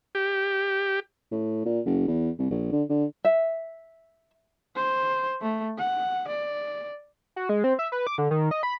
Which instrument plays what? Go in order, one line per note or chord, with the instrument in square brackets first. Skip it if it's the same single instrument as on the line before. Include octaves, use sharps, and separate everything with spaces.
[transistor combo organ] G4
[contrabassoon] A2
A#2
F#1
E2
C2
A#1
D3
D3
[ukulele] E5
[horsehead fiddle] C5
A3
F#5
D5
[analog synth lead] F#4
G#3
C4
E5
B4
D6
D3
D#3
D#5
B5